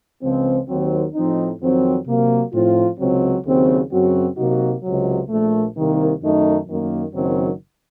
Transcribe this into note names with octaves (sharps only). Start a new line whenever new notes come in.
C#2 C#3 F3 C4
D#2 D#3 F#3 C4
A2 F3 C4 D#4
F2 D#3 F#3 C4
C3 F#3 A#3
A2 F3 C4 F4
C#2 C3 F#3 C4
D#2 C#3 F#3 C4
F#2 C#3 F#3 C4 F#4
C3 F#3 A#3 D#4 F#4
C#2 C3 F#3
A#1 A#2 A3
C2 C3 D#3 A#3
F#2 D#3 A3 D#4
F#2 D#3 A#3
F#1 F#2 D#3 F#3 C4